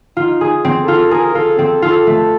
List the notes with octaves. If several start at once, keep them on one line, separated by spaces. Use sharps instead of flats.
D#4 F4
G#4
C4
A4
F4
G#4 A#4
F4 A4
C4 A4
F4 A4
A3